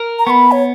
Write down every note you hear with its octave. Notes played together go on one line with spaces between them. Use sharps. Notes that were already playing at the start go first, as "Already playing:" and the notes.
Already playing: A#4
A#5
B3 B5 C#6
C#5